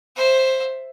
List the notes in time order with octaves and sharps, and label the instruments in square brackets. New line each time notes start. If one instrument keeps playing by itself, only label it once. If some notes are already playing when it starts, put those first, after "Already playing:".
[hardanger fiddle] C5 E5